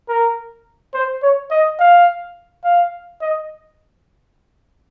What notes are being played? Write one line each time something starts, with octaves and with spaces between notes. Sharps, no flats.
A#4
C5
C#5
D#5
F5
F5
D#5